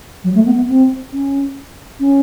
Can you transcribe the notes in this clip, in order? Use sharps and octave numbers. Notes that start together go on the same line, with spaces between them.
F#3
A3
B3
B3
C4
C#4
C#4